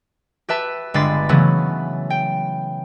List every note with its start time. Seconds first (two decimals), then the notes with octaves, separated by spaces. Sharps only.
0.49 G4 B4 E5 A5
0.94 G1 G#3 B5 D6 A6 C7
1.29 C#3 E3 F#3 A3 B3
2.10 G5